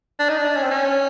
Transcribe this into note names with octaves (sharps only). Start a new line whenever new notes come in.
D4
D#4
D4
C#4
C4
C#4